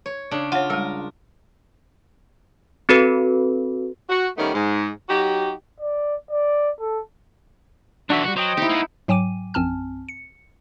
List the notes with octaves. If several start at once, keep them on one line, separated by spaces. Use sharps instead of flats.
C#5
C#3 D4
F4 C#5 F#5
G3 G#3 A#4
C4 F#4 A4 B4
F#4
D#3 G3 A3 B3 C#4 D#4
G#2 G#3
F#3 D#4 F#4 G4
D5
D5
A4
D3 E3 D4 F#4 E5
E3 G3 F#4
F#3 C5 D#5 G5
D#4 E4 G4
A#3 B3
G#2 F#3 G5 G#5 D6 D#7
A#1 F#2 C4 G#5 A5 F6
C#7